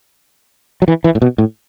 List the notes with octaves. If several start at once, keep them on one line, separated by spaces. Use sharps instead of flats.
F#3
E3
E3
A2
B2
A2